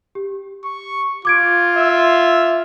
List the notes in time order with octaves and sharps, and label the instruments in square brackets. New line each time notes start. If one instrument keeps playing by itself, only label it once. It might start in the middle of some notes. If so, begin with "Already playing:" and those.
[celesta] G4
[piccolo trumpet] C#6
[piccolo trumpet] F4 [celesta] D6 G#6 D7
[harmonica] E5